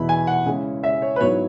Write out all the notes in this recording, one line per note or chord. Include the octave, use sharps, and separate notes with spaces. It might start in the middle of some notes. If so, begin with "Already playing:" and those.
Already playing: E2 B2 B3 E4 B5
G#5
F#5
C#3 G#3 C#4 E4
E5
C#5
B4
G#2 F#3 B3 E4 C#5